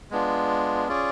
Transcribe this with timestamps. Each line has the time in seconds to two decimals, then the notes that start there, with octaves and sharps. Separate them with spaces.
0.11 G#3 B3 D4 F4
0.88 C#4 F4 G#4 D5